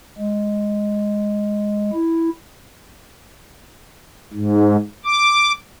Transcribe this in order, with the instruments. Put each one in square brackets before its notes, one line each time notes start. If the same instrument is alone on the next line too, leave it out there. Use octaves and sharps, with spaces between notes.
[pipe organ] G#3
E4
G#2
D6